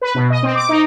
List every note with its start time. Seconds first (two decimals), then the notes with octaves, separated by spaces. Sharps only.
0.02 B4
0.15 B2
0.30 D#5
0.43 C4
0.55 D6
0.69 D#4